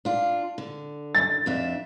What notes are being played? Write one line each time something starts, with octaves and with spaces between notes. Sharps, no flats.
D4 F4
D3
A6
F2 D4 E5